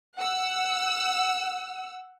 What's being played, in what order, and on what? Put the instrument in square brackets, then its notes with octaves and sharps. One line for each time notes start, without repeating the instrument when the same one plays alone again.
[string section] F#5 E6